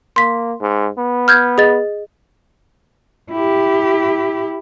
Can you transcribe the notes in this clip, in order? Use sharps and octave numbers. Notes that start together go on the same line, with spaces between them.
A#3 C6 B6
G#2
B3
F6 G6 G#6
G#4 D#5 A6
E4 G4